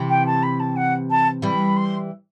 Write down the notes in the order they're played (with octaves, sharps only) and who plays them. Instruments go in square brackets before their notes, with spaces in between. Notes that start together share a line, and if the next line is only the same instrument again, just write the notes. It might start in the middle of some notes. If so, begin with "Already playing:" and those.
Already playing: [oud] C3 E3
[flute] G5
A5
B5
A5
F#5
A5
[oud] E3 G3 [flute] B5
[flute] C6